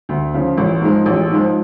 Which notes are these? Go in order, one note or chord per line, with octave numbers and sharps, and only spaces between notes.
D2
C#3 F3
A1
G#2 F3 G#3
A1
G#2 F3 G#3